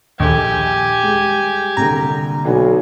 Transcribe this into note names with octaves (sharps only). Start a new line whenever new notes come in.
A#1 D#2 G4 A4 G#5
G3 G#3
C2 A#2 D3 A#5
B1 D5 F#5 G#5